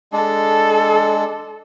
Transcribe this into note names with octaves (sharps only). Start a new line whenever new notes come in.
G#3 D4 A4